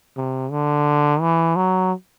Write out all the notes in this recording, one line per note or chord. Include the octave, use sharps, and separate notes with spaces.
C3
D3
E3
F#3